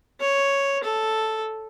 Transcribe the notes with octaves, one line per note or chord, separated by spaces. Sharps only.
C#5
A4